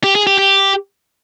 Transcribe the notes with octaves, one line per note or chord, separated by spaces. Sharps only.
G4
G#4
G4
G4